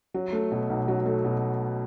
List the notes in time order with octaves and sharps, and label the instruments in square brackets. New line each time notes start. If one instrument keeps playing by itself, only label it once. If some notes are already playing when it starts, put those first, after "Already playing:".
[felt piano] F#3
A3
B2
B1
F#3
A3
B2